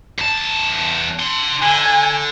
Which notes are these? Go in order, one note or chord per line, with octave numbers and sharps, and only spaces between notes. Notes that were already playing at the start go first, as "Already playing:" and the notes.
E2 A5
D4 C6
D3 G#5